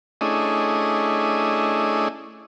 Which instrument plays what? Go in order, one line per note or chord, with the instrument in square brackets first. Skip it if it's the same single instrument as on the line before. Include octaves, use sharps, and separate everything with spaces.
[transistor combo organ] A3 C#4 D4 E4 G#4 D#5